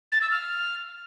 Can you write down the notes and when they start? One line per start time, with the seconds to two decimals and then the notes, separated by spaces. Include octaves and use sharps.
0.12 A6
0.21 E6
0.31 F6